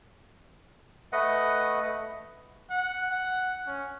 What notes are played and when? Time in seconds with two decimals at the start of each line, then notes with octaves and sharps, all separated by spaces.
1.12 A3 B4 D#5 F#5
2.70 F#5
3.11 F#5
3.67 C#4